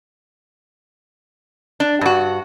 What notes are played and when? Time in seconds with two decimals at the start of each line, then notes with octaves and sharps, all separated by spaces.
1.80 D4
2.01 G2 F#4